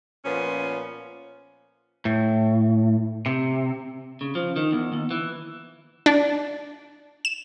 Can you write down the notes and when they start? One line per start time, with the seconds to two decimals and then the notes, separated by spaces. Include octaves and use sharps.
0.25 A#2 F3 B3 C#4
2.05 A2
3.26 C3
4.21 C#3
4.35 F3
4.56 D#3
4.72 E2
4.93 D#2
5.11 E3
6.06 D4
7.25 E7